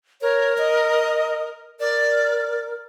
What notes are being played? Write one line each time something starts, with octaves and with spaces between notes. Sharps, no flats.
A#4 C#5
D#5
A#4 D5